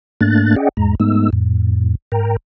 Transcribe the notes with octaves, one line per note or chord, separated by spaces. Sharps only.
G#2 A3 A#3 D4 F#6 A6
C#4 G#4 D5 D#5 F#5 G5
E2 G#2 G#3 A#5
G#2 G#3 A3 B3 D#4 E6
F2 A2
G#2 A#4 G5 A#5